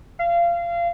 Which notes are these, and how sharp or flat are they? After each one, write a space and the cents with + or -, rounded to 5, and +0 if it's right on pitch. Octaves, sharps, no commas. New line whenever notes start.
F5 -25